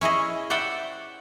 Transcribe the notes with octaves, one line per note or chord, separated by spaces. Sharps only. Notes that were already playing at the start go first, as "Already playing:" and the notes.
C#4 E4 G#4 D#5
C5 D5 E5 F#5 G5 B5